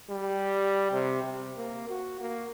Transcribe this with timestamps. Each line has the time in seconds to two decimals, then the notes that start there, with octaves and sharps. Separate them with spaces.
0.10 G3
0.92 C3
1.24 C3
1.57 A#3
1.89 F#4
2.21 A#3